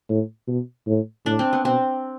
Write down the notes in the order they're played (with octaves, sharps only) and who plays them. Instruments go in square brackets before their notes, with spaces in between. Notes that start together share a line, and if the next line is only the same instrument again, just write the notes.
[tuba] A2
B2
A2
[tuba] A2 [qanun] D4
[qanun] C4
B3
[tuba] B2 [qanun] C4